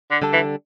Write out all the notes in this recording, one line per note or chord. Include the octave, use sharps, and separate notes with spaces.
D3
D3 G3 D4 A4
E3